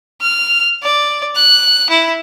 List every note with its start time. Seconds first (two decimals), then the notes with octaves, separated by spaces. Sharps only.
0.21 F6
0.83 D5
1.36 F#6
1.90 E4